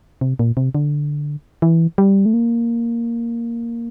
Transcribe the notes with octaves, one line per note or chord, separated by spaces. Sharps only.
C3
A#2
C3
D3
E3
G3
A3
A#3